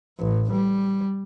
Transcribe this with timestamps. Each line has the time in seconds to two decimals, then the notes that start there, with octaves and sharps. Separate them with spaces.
0.19 A1
0.52 G3